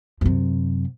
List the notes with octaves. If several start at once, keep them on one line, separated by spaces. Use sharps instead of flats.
F#2 C3